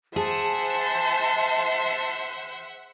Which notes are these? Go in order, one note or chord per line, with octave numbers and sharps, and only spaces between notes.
G#4 C5 E5 F#5 A5